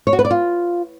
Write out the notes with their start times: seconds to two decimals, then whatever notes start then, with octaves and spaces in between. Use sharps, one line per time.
0.07 C#5
0.13 F#4
0.19 B4
0.25 D5
0.31 F4